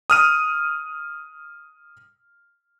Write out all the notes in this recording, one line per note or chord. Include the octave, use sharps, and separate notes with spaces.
D#6 F6 D#7